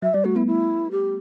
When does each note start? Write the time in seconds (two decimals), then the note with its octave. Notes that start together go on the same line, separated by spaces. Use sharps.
0.02 F#3 E5
0.14 G3 D5
0.25 A3 F#4
0.36 B3 E4
0.47 E4
0.91 G4